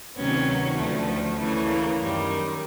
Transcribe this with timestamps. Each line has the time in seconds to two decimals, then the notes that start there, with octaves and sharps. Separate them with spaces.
0.17 D2 C3 D#3 F#3 B3 C#4
0.77 D2 D3 F3 A3 B3
1.07 A3
1.38 D2 C#3 E3 A3
1.68 A#3
1.99 F#2 D#3 G3